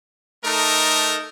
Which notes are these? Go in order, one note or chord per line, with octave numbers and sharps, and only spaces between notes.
A3 D#4 A4 A#4